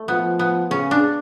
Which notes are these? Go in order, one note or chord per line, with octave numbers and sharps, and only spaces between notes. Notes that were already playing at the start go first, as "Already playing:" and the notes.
Already playing: A3
F3 B3
B3
C#3 C#4
D4